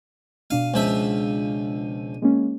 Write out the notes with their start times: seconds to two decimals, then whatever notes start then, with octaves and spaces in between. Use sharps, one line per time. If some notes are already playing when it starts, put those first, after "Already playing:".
0.50 B2 D4 F5 D#7
0.74 C#2 F3 E5
2.22 G#3 A#3 C#4